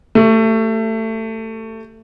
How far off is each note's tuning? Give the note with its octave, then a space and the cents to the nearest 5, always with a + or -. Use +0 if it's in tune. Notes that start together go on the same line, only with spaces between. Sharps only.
A3 +20 G4 +0